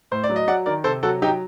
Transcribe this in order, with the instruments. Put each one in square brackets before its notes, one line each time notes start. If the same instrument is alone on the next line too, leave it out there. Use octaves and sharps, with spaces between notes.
[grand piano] A2 C5
D5
F#3
D#5
F#3 D5 F#5
D#3 A#4 D5
C3 A4 C5
F#3 F#4 A4
F#3 D#4 G4